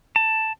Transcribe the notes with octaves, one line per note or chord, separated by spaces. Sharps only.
A5